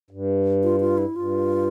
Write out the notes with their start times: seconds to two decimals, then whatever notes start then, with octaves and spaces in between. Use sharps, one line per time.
0.11 G2
0.64 F4
0.80 F4
0.98 E4
1.15 G2 F4